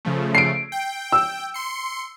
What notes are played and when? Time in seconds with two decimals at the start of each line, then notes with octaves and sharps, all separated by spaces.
0.05 C#3 F3 A3
0.35 C7 D7
0.72 G5
1.12 E6
1.54 C6 C#7